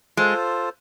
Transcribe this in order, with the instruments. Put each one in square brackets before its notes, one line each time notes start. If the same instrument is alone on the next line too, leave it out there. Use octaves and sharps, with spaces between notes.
[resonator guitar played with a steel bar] G#3 [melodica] F4 A4 C5